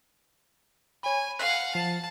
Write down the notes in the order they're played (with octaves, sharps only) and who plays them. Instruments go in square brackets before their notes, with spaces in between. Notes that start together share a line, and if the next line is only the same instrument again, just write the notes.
[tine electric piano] C#5 B5 [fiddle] G#5
[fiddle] F5 F#5 [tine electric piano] F#6 C7
[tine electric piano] F3 [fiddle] A5